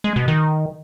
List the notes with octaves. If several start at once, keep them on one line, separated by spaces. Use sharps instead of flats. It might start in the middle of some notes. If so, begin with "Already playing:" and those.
G#3
B2
D#3